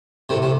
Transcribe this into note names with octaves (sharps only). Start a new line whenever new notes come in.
A2 C3
C3